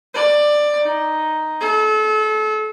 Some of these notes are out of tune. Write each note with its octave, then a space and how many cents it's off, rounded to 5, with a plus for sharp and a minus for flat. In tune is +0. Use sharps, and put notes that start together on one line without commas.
D5 +15
D#4 +0
A4 -35